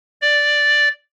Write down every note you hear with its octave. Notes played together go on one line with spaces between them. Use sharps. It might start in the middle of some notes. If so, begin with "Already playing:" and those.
D5